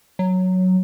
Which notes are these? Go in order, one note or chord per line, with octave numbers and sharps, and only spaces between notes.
F#3